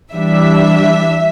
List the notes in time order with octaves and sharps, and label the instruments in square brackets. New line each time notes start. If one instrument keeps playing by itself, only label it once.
[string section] E3 G3 D4 E5